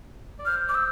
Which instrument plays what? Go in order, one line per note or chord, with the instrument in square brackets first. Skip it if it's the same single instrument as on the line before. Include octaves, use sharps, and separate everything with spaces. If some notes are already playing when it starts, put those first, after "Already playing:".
[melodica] D5
[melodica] C5 [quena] F6
[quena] D6
E6